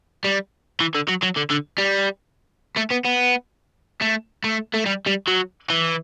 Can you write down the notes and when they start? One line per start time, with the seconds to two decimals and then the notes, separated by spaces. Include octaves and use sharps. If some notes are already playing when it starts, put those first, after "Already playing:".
0.24 G3
0.80 E3
0.95 D3
1.08 F#3
1.23 F#3
1.36 D3
1.50 D3
1.78 G3
2.76 A3
2.91 B3
3.05 B3
4.02 A3
4.44 A3
4.74 A3
4.86 G3
5.07 G3
5.28 F#3
5.70 E3